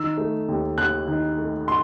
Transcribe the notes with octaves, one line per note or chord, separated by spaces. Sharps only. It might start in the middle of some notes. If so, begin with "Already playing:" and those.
Already playing: D#3 E6
A3
D#2
D#2 F#6
D#3
A3
C6